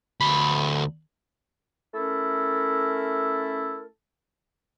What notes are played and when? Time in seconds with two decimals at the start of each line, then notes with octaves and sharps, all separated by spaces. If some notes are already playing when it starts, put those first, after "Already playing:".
0.20 D2 B5
1.94 A3 C#4 E4 A4 A#4